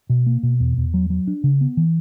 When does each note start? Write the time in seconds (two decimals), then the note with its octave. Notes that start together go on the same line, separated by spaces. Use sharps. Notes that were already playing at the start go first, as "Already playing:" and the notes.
0.09 B2
0.26 A#3
0.43 B2
0.60 E2
0.77 E2
0.94 F#3
1.10 F#3
1.27 D4
1.44 C#3
1.61 B3
1.77 E3